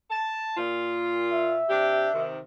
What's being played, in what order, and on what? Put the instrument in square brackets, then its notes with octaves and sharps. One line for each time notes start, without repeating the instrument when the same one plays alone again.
[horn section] A5
A#2 F4
[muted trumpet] E5
[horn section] C3 D4 G4
C3 D#3